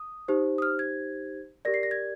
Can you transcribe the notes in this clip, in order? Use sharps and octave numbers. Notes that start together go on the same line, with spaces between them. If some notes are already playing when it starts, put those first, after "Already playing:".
Already playing: D#6
D#4 G4 C5
D#6
F6
G#6
G4 A#4 D5 A#6
C7
A#6
G#6